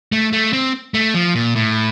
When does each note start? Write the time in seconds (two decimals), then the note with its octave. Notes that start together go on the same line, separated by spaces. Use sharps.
0.12 A3
0.33 A3
0.53 C4
0.94 A3
1.14 F3
1.35 A#2
1.55 A2